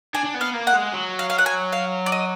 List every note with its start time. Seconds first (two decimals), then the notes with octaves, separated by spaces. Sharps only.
0.14 D4 G#5
0.24 D4
0.34 B3
0.41 F5
0.54 A#3
0.67 F#5
0.73 G#3
0.93 F#3
1.19 F5
1.30 F5
1.38 F#5
1.46 G#5
1.73 F5
2.06 D5
2.12 D#5